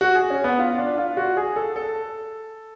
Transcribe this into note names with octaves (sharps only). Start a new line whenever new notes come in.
F#4
G#4
C#4
B3
F4
D4
F4
F#4
G#4
A4
A4